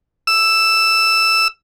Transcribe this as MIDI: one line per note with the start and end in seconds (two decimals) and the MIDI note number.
0.27 1.48 88